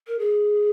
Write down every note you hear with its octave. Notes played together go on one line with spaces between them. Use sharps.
A#4
G#4